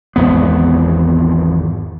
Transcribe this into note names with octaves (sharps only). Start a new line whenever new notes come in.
G#1 E2 B3